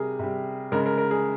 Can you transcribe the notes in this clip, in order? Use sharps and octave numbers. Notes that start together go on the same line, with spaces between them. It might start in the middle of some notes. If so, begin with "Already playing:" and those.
Already playing: C3 G3 G#4 A#4
C3 G3
C#3 G#3 A#4
A#4
A#4
G#4